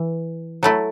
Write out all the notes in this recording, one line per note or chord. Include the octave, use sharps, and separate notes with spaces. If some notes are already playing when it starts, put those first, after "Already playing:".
Already playing: E3
F#3 A3 E4